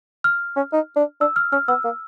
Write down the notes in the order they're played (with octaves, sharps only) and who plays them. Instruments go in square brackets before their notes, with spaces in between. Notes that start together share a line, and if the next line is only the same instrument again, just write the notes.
[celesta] F6
[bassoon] C#4
D#4
D4
[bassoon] D4 [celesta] E6
[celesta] F6
[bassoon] C#4 [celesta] F6
[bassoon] B3 [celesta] E6
[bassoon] A#3